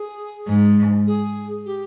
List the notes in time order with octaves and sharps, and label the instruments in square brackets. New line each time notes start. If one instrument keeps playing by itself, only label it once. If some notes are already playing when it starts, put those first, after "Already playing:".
Already playing: [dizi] G#4
[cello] G#2
[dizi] G#4
G4